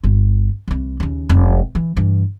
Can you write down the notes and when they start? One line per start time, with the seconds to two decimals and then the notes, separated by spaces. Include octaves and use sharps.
0.04 G1 F4
0.68 C2 E3
1.00 D#2 C#3
1.29 F1 C#2
1.75 E3
1.96 G2 E3